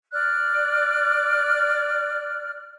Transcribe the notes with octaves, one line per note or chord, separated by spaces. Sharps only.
D5 F6 F#6